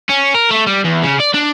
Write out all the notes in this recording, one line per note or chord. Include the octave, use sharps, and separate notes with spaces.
C#4
A#4
A3
G3
E2
C#3
D5
D4